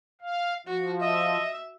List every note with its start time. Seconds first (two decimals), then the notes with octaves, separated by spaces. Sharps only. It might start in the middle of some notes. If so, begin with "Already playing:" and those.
0.21 F5
0.67 F3 F#4
1.01 D#5 E5